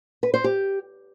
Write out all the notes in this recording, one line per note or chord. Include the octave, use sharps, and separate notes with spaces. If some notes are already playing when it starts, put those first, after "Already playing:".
B4
C5
G4